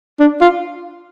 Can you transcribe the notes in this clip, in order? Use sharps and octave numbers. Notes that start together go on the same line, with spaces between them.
D4
F4